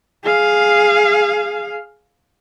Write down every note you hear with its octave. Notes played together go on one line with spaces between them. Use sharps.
G#4 F5